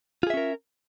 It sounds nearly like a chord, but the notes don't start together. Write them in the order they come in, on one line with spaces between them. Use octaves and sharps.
F4 G#4 E5 C#4 A#4